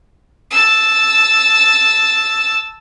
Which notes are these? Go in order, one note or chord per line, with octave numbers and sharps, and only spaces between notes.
A5 E6